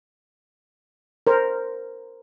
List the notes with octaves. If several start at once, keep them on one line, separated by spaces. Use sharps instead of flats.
A#4 C5